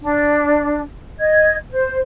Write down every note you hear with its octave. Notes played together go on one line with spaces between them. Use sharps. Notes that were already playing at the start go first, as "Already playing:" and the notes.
D4
D#5 G#6
C5